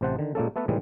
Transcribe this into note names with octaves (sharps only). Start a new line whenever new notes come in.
A1 C3 C5 F#5 A5
D3 D#3
A#2 G#3 A#3 C#4 A4
A3 B3 A4 B4
A2 C3 D#3 E3 G3 G#3